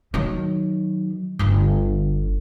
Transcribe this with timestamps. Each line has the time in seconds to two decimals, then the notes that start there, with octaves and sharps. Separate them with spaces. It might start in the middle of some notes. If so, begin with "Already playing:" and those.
0.14 D#3 F#3
1.39 G1 D3